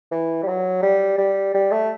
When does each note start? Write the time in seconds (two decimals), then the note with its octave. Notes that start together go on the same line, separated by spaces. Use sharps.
0.12 E3
0.43 G3
0.48 F#3
0.83 G3
1.18 G3
1.54 G3
1.71 A3